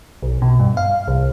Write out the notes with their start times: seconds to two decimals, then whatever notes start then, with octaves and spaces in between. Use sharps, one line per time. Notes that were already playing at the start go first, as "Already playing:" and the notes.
0.23 B1
0.42 B2
0.60 G2
0.77 F5
1.08 C2